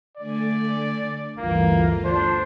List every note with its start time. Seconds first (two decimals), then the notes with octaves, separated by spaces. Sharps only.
0.17 D3 A3 D5 G#5
1.38 G1 D2 E3 A#3 F4
2.04 D4 C5